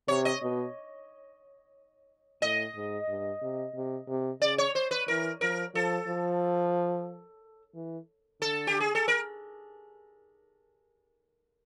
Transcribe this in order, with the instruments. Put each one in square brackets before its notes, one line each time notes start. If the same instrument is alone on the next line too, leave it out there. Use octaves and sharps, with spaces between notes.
[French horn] C3 [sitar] C#5
[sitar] D#5
[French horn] B2
[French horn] A2 [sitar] D#5
[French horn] G#2
G2
C3
C3
C3
[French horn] C#3 [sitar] D5
[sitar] C#5
C5
B4
[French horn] E3 [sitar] A#4
[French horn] F3 [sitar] A#4
[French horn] F3 [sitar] A4
[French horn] F3
E3
[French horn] D3 [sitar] A4
[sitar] G4
G#4
A4
A#4